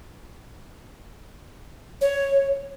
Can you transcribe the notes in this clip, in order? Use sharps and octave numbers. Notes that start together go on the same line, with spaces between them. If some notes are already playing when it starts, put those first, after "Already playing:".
C#5